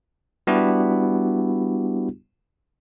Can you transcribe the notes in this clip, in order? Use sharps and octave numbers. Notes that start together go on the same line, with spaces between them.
G3 B3 D4 E4 F#4 G4